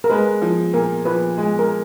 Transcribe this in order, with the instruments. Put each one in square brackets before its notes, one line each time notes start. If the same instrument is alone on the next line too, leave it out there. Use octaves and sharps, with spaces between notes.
[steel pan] A#4
[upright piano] G#3 [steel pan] B4
[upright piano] F3
[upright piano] A#2 [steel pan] A#4
[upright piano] F3 [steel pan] B4
[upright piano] G#3
[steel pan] A#4